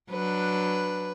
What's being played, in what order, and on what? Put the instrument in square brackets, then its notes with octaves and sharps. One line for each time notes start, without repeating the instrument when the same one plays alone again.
[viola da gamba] F#3 D4 [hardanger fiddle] B4